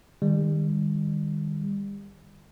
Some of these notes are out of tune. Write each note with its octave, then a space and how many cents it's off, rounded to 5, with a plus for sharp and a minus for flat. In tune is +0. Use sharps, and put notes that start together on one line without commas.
D#3 -20 G3 +35